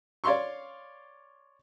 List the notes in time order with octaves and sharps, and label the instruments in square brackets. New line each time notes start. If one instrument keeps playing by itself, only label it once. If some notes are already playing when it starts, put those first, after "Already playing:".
[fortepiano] C#5 D5 F5 C6 C#6